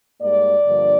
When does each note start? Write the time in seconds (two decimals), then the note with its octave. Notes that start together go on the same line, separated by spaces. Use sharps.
0.20 G#2 G3 A#3 D5
0.65 G2 D3 F3 A#3